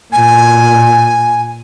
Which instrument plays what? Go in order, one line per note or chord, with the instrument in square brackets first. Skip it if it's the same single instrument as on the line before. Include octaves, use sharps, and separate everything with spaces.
[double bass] A#2 [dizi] G#5